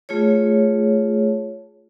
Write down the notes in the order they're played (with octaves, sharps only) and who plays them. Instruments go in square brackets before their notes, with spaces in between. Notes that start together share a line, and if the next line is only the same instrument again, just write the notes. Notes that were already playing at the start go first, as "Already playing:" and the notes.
[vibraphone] A3 F4 G#4 C#5